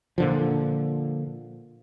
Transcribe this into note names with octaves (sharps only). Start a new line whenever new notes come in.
A#2 D3 F3